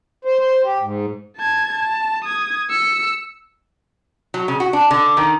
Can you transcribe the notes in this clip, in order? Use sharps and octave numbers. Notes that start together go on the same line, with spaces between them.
C5
C5
G4
G#2
A5 G#6
A5
D#6 G#6
E6 C#7
F#3
C#3
F#4
D4
D3
D#3